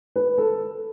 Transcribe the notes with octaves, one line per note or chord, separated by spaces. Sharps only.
B4
A4